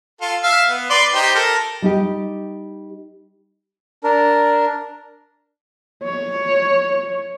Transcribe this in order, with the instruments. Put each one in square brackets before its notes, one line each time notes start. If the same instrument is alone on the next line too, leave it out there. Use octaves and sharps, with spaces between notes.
[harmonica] F4 A4
E5 F5
B3
B4 D5 C6
D#4 G4 C5
A4 A#4
[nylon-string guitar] G3 D#4 G4
[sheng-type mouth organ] D4 A#4
[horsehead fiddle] C#5